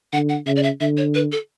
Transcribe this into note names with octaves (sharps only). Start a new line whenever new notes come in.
D3 F#5
F#5
C#3 E5
D5
E5
D3 E5
C#5
B4
A4